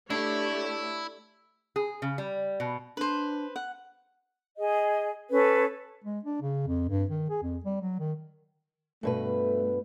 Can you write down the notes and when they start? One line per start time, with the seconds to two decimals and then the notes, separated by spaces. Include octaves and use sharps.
0.10 A3 D4 E4 G4 C#5
1.76 G#4
2.02 C#3
2.18 G3
2.60 B2
2.97 D4 B4 C5
3.56 F#5
4.56 G#4 D#5
5.31 C#4 A4 B4
6.04 G#3
6.24 D4
6.42 C#3
6.67 F2
6.89 G2
7.10 D#3
7.30 G#4
7.43 F2
7.64 G3
7.81 F#3
7.99 D#3
9.03 G2 B2 A3 B4